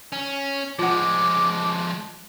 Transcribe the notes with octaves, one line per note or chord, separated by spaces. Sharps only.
C#4
F3 G#3 F4 F#5 D6